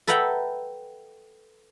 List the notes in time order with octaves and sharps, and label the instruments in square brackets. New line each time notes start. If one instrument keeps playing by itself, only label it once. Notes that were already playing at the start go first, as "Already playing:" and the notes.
[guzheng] A4 B4 E5 F#5 G5 A#5